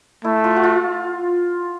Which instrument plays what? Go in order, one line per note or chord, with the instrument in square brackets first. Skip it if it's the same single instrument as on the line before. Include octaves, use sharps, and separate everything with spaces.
[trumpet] A3 [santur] E4
[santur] F4
F#4
F4